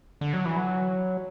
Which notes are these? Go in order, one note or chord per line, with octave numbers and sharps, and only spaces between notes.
D3
F#3
E3
F#3